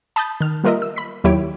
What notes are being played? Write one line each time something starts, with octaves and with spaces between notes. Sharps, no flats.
A5 B5 D#6 G6 A6
D#3 F6
G3 A#3 F4 A#4 D#5 E5
E6
B5 B6
D#2 F#3 E4 G4 C#5 D7